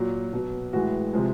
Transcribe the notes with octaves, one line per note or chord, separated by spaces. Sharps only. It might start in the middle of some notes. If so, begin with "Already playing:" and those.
Already playing: A#2 F#3
B2 F#3
A2 E3 G#3 F#4
C3 F3 G#3